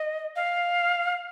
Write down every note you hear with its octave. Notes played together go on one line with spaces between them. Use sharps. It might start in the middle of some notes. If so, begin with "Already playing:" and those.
Already playing: D#5
F5